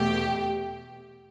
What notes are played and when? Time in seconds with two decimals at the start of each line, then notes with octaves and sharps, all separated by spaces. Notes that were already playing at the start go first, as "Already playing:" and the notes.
Already playing: E2 B2 A3 G4